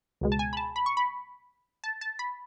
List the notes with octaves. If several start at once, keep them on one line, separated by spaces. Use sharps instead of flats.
C#2 B2 G#3
A5
G#5
B5
A5
B5
C#6
B5
A5
A5
B5